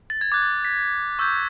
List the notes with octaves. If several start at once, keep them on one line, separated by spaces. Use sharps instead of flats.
A6
G#6
D6 F#6 G#6
A6
B6
C#6 E6 G6